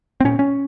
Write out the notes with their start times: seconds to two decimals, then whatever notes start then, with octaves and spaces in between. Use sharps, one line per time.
0.20 C4
0.24 A#2 C#4
0.39 C#4